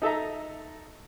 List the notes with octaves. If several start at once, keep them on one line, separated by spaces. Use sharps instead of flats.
D#4 A4 E5 A#5